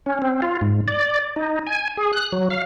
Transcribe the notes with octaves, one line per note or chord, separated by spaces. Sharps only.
C#4
C4
F4
G#2
D5
D#4
G#5
G#4
F#6
F#3
F5